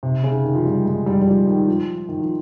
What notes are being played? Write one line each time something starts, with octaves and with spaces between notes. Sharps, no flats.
C3
C#3
D#3
F3
G3
G#3
G3
G3
F3
D#3
F3
D#3
F3